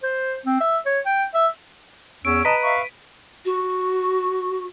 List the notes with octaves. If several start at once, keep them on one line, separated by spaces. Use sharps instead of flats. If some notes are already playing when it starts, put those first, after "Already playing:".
C5
C4
E5
C#5
G5
E5
E2 C#4 E6 D7
B4 D#5 A5 A#5 B6 D#7
E5 F5 C#6
F#4